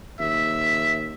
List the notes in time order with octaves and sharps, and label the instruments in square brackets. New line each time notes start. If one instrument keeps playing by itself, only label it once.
[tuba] D#2 [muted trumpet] E5